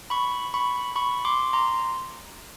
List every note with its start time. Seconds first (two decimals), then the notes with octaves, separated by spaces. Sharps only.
0.10 B5 C#6
0.54 B5 C#6
0.96 B5 C#6
1.25 C6 D6
1.53 A#5 C6